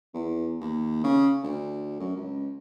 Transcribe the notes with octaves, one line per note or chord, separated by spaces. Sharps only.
E2
D#2
C#3
D2
F#2
C#2